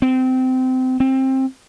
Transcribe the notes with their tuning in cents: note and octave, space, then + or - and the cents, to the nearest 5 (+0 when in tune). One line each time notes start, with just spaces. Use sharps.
C4 -25
C4 +20